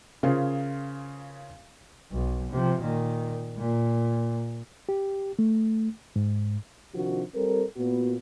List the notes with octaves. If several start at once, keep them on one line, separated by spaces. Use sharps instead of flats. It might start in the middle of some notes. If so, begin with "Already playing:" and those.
C#3 F4 G#4 A#4 C5
B1
C3 F3
A#2 D#3
A#2
G4
A3
G#2
C3 D#3 F3 D4 D#4 F#4
G3 C4 A4 A#4
A#2 B3 F#4